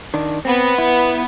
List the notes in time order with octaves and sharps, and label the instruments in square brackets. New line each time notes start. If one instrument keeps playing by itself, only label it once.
[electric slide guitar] D#3 D4
[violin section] B3 [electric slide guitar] C4
[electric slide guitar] E4